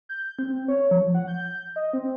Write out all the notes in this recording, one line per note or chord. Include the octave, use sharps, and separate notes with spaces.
G6
C4
C4
C#5
F3
F#5
G6
D#5
C4